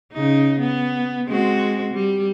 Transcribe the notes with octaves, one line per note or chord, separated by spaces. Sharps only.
C#3 D#4
B3
G#3 C4 F#4
G3